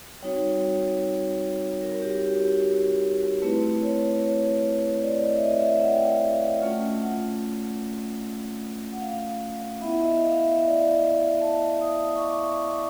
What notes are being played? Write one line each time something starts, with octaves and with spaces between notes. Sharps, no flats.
G3 C4 D#4 F#4 C#5
A#4
G4
F#4
G4
A3 C4 E4 B4
C#5
C#5
D5
D#5
E5
D#5
D#5
E5
F#5
G5
F#5
F5
A3 C#4 F4
F#5
F#5
F5
B3 E4 E5
E5
D#5
F5
E5
D#5
D5
D#5
A5
D#6
D#6
C#6
D6
C#6
D6